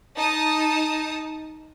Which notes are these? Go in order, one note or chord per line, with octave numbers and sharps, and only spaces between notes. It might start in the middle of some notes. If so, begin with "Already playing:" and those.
D#4 A5 D#6